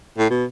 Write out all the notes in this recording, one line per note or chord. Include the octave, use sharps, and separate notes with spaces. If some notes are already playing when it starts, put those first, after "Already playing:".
A2
B2